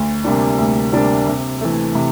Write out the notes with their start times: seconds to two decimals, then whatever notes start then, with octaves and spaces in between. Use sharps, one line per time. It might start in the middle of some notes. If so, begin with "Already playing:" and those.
Already playing: D2
0.24 C3 G3 A#3 D4
0.58 D2
0.92 C3 G3 A#3 D4
1.27 C3
1.61 E3 A3
1.95 C3